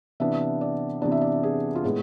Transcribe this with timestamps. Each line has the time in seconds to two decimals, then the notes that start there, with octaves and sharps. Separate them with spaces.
0.20 C3 E3 B3 D4 E5
0.61 D5
1.02 C3 E3 B3 D4 D5
1.12 E5
1.21 D5
1.43 G#4
1.75 F4
1.84 A2 G#3 B3 G#4